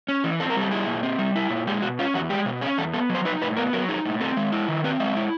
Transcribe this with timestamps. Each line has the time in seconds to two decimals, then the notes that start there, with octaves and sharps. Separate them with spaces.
0.09 C#4
0.24 E3
0.40 C4 A4
0.50 A#4
0.56 G3 A4
0.71 E4 G#4
0.87 A#2
1.03 C4
1.19 G3
1.35 E4
1.50 A#2
1.67 G#3 G4
1.82 B2 F#4
1.99 C#4 F4
2.14 E2 F#4
2.30 G#3 G4
2.46 B2
2.61 C#4 G#4
2.78 E2 A4
2.94 B3 A4
3.09 F#3
3.15 C5
3.25 D#4 B4
3.41 A2 B4
3.57 B3 A#4
3.73 F#3 A#4
3.89 D#4 G#4
4.05 A2
4.21 C4 A4
4.37 G#3
4.53 E4
4.68 D#3
4.84 C4 B4
5.00 G#3 E5
5.17 E4